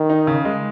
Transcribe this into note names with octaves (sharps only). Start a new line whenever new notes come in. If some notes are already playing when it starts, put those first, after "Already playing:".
Already playing: D#3
D#4
C#3
G#3